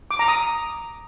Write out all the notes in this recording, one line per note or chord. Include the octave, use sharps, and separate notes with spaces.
D6
A#5
D#6